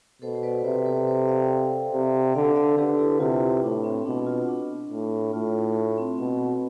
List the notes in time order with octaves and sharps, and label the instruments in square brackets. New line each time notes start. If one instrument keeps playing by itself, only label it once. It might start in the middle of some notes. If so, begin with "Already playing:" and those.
[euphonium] B2 [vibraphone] A4 C5
[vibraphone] C5
B4 D5
[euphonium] C3 [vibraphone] C5 E5
[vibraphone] A4 C5
A4 C5
D5 F5
G5
D5 F5
[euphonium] C3
[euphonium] D3 [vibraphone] D5 F5
[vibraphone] D5 F5
[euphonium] D3 [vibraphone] G4 B4
[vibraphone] E4 G4
[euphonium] C3 [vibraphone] F4
[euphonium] A2 [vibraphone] D4
[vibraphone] C4
[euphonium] B2 [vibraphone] D4
[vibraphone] F4
D4
[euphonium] A2
[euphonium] A2 [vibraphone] F4
[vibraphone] C4
[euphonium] B2 [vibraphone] C4